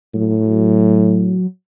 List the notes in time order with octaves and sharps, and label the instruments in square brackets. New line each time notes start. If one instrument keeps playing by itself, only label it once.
[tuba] A2 [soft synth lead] F#3